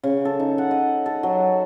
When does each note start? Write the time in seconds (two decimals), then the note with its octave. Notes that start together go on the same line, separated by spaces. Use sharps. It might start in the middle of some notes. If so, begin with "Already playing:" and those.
0.03 C#3
0.25 A4
0.39 D#4
0.58 F#5
0.71 D#5
1.06 A4
1.23 F#3